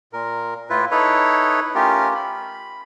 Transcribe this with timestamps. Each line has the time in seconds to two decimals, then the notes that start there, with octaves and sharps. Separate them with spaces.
0.13 A#2 A#4
0.70 A2 E4 F4 B4
0.91 D#4 E4 A4 B4 C#5
1.75 A3 C#4 F4 G4 A#4
2.15 B5